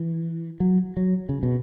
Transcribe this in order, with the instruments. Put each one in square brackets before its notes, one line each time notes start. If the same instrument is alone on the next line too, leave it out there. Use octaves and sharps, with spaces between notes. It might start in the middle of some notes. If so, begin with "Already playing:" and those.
Already playing: [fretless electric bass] E3
F#3
F#3
C#3
B2